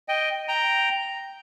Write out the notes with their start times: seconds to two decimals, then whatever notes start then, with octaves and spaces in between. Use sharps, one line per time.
0.08 D#5 G5
0.48 G5 A#5